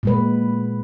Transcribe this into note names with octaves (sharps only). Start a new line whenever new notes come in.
A#2 G#3 B4